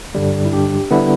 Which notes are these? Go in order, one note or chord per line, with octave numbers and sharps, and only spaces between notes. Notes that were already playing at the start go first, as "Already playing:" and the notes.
G2 D3 G3
E4
D4 G4
D3 G3 B3 E4